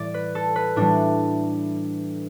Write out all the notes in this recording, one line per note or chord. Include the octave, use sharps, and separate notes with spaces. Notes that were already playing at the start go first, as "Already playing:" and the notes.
Already playing: A2 E3 G3 D5
B4
A4
B4
A2 E3 G3 D4